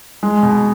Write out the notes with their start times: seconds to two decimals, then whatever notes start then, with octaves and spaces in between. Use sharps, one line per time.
0.23 G#3
0.43 B2